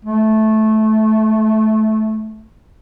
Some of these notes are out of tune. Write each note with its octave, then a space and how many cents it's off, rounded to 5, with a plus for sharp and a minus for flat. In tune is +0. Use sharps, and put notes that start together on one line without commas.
A3 -15